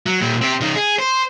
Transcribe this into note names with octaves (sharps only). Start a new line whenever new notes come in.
F#3
A#2 G3
C4 G4
C#3 D#4
G#4
C5